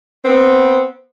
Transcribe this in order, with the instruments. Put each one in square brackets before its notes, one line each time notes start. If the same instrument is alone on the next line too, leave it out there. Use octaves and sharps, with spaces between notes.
[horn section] B3 C4